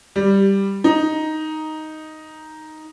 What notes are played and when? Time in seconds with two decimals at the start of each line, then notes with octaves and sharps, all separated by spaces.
0.16 G3
0.84 D#4